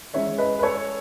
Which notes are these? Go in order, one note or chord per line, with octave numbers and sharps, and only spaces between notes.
E3 G#3 C#4 C#5 E5
B4 D#5
B4
A4 C#5